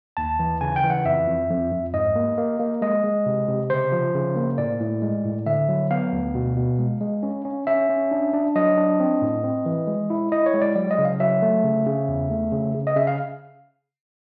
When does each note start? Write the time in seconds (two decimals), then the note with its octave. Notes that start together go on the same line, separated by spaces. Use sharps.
0.17 D#2 A5
0.39 E3
0.61 C#3 G#5
0.76 G5
0.83 E3
0.90 F#5
1.05 F2 E5
1.27 F2
1.49 F2
1.72 F2
1.94 G#2 D#5
2.16 A#3
2.38 A#3
2.60 A#3
2.82 G#3 D#5
3.04 G#3
3.26 C3
3.48 C3
3.70 C#3 C5
3.92 F3
4.14 C#3
4.36 A#3
4.58 A2 D5
4.81 A2
5.02 G#3
5.24 A2
5.46 D3 E5
5.69 F#3
5.91 B3 F5
6.13 D2
6.35 B2
6.57 B2
6.79 G#3
7.01 G#3
7.23 C#4
7.45 C#4
7.67 C#4 E5
7.89 C#4
8.11 D4
8.34 D4
8.55 F#3 D#5
8.77 D4
9.00 C4
9.22 A2
9.44 C4
9.66 E3
9.87 G#3
10.10 E4
10.32 E4 D#5
10.46 C#5
10.54 G#3
10.62 D5
10.76 F#3 D5
10.91 D#5
10.98 C#3
11.05 F5
11.20 F#3 E5
11.42 A3
11.64 C#3
11.86 C#3
12.08 E2
12.30 A3
12.52 C#3
12.75 C#3
12.87 D#5
12.96 C#3 E5
13.07 F5